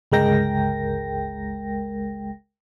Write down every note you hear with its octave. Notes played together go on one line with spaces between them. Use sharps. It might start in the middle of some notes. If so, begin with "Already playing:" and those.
G1 C#2 G#3 A#4 G5 A#6